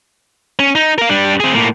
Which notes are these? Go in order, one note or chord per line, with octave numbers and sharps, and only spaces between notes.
C#4
D#4
A#4 F5
G3 D4
C4 G#4
A2 A#3